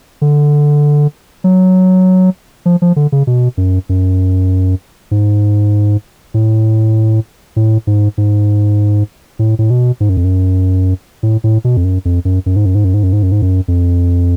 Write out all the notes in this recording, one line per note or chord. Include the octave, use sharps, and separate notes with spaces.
D3
F#3
F3
F3
D3
C#3
B2
F#2
F#2
G#2
A2
A2
G#2
G#2
A2
A2
B2
G#2
F#2
F2
F#2
A2
A2
B2
F2
F#2
F2
F#2
F#2
G#2
F#2
G#2
F#2
G#2
F#2
G#2
F#2
G#2
F#2
F2